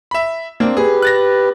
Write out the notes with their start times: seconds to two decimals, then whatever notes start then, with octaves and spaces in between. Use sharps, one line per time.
0.11 E5 B5
0.60 A#3 C4 D4
0.77 G4 G#4 B4
1.02 F#6 A6 A#6